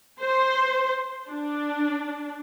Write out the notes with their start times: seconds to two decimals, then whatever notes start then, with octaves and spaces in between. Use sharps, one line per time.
0.19 C5
1.29 D4